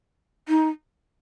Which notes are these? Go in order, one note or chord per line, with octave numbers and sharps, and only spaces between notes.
D#4